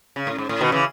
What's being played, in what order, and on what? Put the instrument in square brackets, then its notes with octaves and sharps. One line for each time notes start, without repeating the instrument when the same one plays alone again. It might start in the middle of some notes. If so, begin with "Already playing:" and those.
[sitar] C#3
A2
G#2
A2
B2 D#3
C#3 E3